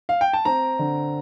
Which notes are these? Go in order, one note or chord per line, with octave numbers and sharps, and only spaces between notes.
F5
G5
A5
C4 A#5
D3